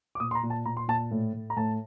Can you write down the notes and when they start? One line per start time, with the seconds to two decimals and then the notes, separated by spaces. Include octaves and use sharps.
0.15 D6
0.20 A#2 D#6
0.31 C6
0.35 A#5
0.43 A#2
0.50 A5
0.66 A#2 A#5
0.77 C6
0.88 A#2 A5
1.11 A2
1.33 A2
1.50 A#5
1.57 A2 A5